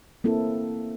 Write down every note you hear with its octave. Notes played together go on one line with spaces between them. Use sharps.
A#3 C4 E4 A4